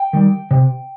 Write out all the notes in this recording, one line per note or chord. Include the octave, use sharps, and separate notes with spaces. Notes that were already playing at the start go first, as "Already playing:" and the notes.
Already playing: G5
D#3 G3
C3